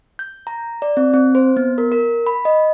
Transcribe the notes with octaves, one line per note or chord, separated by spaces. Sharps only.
G6
A#5
D5
C4
C4
C5
B3
A#4
A#4
B5
D#5